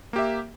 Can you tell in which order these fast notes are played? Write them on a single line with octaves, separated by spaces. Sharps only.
A#3 G4 E5